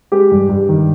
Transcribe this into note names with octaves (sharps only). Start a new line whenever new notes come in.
G#3 G4
G2
G2
D#3